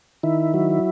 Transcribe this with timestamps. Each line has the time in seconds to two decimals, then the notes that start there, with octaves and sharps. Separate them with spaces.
0.23 D#3 E4
0.54 F#3